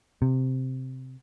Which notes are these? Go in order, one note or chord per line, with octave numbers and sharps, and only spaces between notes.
C3